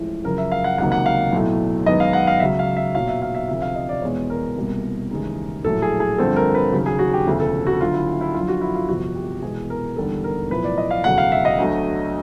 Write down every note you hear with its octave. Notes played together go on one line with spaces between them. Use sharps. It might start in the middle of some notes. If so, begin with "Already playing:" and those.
Already playing: A1 A2 F3 G#3
F#2 C#3 F3 A#4
E5
F5
F#5
C#2 C3 D#3 F#3 A#3 F#5
F#5
F5
B1 A2 F#3 A3
F#2 D#3 G#3 B3 D#5
F5
F#5
F5
C#2 C#3 F#3 E5
F5
E5
B1 A#2 F#3 F5
E5
F5
E5
D2 C3 F3 E5
F5
D#5
D5
E2 B2 G#3 B3 C#5
A#4
C2 B2 G3 A#3
D#2 C#3 E3 G#3
A#1 A2 F#3 A3 A4
G#4
G#4
G2 D3 F3 A3 C4 A4
A#4
B4
D#2 C#3 F#3
G#4
F#4
G4
E1 D2 C#3 F3 A3
A4
F#4
D2 D3 F#3 F4
E4
E4
F#2 D3 F3 F4
F#4
E4
F4
G1 F2 C3 F3 F#4
G4
E1 E2 B2 G#3 B3 G#4
A#4
E1 D#2 D3 G3 A4
A#4
B1 A2 F3 B4
D5
D#5
F5
E1 D2 C#3 F#3 A3 F#5
F5
E5
D#5
D2 D3 F#3 A3